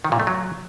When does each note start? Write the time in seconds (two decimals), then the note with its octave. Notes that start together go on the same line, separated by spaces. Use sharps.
0.04 D#3
0.12 A#2
0.20 A3
0.27 F#3